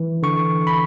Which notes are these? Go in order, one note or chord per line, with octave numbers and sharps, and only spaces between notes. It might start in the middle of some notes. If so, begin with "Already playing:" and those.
Already playing: E3
D3 C#6
B5